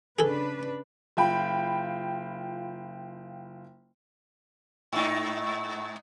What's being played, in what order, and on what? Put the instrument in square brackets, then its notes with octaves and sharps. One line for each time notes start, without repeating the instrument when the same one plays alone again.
[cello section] C#3 D4 B4 [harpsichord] G#4 A4
[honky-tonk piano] F#1 F4 G5 B5
[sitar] G#2 D#4